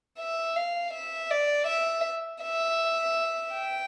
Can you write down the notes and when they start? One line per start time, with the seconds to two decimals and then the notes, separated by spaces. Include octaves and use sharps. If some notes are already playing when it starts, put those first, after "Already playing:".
0.19 E5
0.56 F5
0.93 E5
1.31 D5
1.67 E5
2.42 E5
3.54 G5